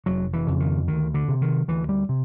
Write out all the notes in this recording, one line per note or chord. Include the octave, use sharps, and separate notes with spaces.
F1 F#3
E3
F2 C#3
D#3
D2 D#3
D3
C3
D#3
D2 E3
G3
C3